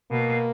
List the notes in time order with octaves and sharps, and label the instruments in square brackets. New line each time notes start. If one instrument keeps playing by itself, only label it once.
[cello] B2 [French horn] A#3